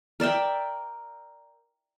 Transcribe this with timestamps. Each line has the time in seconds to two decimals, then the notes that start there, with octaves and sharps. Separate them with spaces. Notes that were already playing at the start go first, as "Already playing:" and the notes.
0.20 A#4 D5 E5 G5